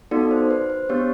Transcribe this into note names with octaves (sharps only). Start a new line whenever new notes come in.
B3 D#4 F#4 A4 D5
C5
B4
C5
B3 D4 G4 C#5